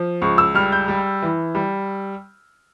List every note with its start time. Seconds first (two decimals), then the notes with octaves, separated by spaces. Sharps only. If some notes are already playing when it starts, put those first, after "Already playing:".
Already playing: F3
0.22 C#2 C#6
0.38 E6
0.54 G3 F6
0.72 G6
0.88 G3
1.22 E3
1.55 G3